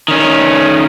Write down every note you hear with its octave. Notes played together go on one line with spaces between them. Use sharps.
D#3 C#4